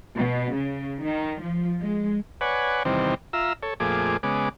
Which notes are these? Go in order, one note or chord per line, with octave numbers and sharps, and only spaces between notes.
B2
C#3
D#3
F3
G#3
B4 C#5 D5 F#5 G#5
E2 C3 D#3 G3 C4
F4 E5 A#5 E6
A4 C#5
F2 A#2 A3 G#4 D6
C#3 G#3 B3 D6